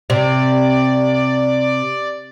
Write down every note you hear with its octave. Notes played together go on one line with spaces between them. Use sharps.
C3 D5